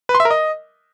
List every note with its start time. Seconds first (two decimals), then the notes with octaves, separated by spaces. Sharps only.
0.09 B4
0.15 C6
0.20 E5
0.25 A#4
0.31 D#5